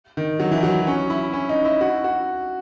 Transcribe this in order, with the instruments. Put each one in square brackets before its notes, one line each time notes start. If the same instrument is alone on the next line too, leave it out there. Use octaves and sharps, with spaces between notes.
[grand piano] D#3
F#3
E3
F#3
C#4
E4
C#4
D#4
E4
F#4
F#4